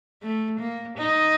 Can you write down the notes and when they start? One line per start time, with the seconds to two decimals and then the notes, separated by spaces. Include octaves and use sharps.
0.22 A3
0.60 A#3
0.98 D#4